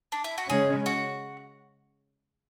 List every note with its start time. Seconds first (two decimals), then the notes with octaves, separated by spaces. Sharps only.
0.12 D4
0.24 E4
0.38 F#4
0.50 C#3 G#3 C#4 G#4
0.86 F#4